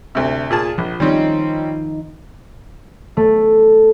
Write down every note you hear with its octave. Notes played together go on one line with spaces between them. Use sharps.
D2 C3
A#2 G#4 A5
A#1 F3
D#3 G3 C4 C#4 D#4
A3